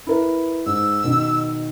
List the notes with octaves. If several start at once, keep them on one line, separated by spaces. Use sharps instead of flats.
E4 A#4 B4
G#2 E6
B2 D#3